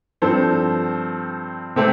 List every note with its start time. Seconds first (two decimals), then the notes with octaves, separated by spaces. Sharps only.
0.22 G2 F3 C4 A4 C5
1.76 C3 A3 C4